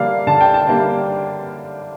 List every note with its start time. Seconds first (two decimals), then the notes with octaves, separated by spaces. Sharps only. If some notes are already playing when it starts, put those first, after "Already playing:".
Already playing: D3 G3 A#3 D4 F5
0.27 D3 A5
0.41 G5
0.54 A5
0.67 G3 A#3 D4